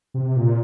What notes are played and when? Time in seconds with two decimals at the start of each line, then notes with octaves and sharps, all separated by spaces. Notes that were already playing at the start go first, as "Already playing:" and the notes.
0.14 C3
0.36 A#2